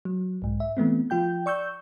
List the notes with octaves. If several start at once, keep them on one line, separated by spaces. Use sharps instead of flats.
F#3
B1 G#2
E5
E3 A3 B3 C4
F3 F4 G5 G6
D5 C#6 E6 G6